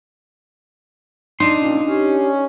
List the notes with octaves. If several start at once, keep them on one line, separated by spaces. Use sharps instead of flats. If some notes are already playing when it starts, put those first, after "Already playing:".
D4 D#4 C6
A#2 C#4
C#4 G4